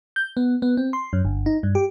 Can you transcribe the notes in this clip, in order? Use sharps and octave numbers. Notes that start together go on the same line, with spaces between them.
G6
B3
B3
C4
C6
F#2
G1
D#4
G2
G4